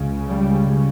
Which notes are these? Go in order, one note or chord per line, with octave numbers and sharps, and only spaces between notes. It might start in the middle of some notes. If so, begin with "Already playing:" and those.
Already playing: C#2 C#3
G3